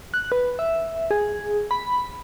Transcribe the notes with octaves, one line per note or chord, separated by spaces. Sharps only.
F#6
B4
E5
G#4
B5